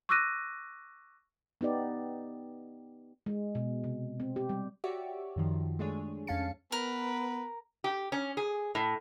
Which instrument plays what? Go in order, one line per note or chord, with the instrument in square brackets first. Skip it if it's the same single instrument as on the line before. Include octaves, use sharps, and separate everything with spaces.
[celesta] C#6 D6 E6 F#6 A#6 D#7
[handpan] B3 D#4 G4 D5
G#3
B2
C3
C4
G4
G3
[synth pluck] F#4 G4 C#5 D5 E5
F#2 D#3 F3
G#3 A3 D4 G#4 C#5
F2 C#4 F5 A5 C#7
[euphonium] B3 [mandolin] A#4 [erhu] B4
[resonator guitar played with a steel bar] G4
C#4
G#4
A2